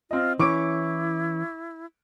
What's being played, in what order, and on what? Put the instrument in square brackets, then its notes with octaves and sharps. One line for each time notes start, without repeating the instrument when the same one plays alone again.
[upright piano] C4 D#5 [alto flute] F4
[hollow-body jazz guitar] E3 C#4 [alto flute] E4 [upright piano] C#6 D6 D7